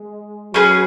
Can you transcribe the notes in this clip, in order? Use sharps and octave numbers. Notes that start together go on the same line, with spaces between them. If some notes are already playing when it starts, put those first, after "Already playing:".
Already playing: G#3
F#3 C#4 G#4 B4